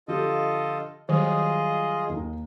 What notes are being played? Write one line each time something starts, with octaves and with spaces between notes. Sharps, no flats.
D3 F3 F4 G4 A4 D#5
D#3 F#3 G3 F4 G#4 D#5
D#2 D#4